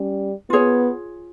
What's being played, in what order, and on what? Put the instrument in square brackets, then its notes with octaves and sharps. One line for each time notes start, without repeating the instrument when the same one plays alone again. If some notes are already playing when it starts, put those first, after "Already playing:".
Already playing: [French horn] G3 [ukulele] C#4
[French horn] B3 [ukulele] F4 G#4 C#5